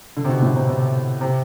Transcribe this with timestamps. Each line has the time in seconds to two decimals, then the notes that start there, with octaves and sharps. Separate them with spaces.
0.17 D3
0.25 C3
0.29 B2
0.42 A2
0.56 C3
0.68 C3
1.21 C3